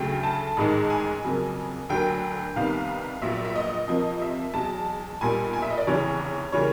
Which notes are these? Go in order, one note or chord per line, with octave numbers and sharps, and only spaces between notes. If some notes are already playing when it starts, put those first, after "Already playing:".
Already playing: D2 C#3 F#3 A3 G5
A5
A1 G#2 D#3 G#3
G#5
F2 C#3 F#3 A#3
D2 D3 F#3 A#3 G5
C2 C3 D#3 G3 B3 F5
A#1 A#2 F#3 B3 E5
E5
D#5
F2 C3 F3 A#3
E5
E2 B2 F#3 A5
B1 A#2 G3 A#3 G#5
G#5
E5
D#5
D5
F1 E2 C#3 E3 C#5
C#3 E3 G3 A#3 C#5